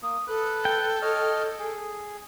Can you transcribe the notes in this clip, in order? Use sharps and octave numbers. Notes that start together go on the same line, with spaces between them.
A#3 D#6
A4 B4 F#6
G5
C#5 D#5 F6
G#4